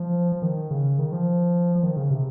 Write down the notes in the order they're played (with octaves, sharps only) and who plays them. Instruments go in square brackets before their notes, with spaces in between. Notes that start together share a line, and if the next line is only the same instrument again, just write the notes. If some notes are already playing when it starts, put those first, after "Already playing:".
Already playing: [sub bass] F3
F3
D#3
C#3
D#3
F3
F3
D#3
C#3
C3